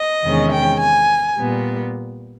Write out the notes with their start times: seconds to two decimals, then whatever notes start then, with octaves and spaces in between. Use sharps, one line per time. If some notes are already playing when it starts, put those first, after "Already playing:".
Already playing: D#5
0.23 E2 C3 D#3 G#3 C#4
0.51 G5
0.81 G#5
1.38 A#2 G3 B3